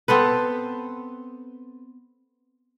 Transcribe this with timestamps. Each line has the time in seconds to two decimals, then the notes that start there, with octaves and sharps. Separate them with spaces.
0.08 B3 C4 A4 B4